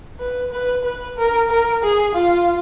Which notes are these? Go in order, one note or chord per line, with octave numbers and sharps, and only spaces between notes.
B4
B4
B4
A#4
A#4
G#4
F4